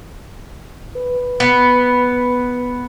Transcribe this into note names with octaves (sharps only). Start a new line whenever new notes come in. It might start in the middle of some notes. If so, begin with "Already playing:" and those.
B4
B3